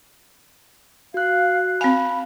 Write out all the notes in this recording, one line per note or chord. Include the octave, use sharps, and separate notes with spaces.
F#4 F5 F#6
C4 F5 G#5 B5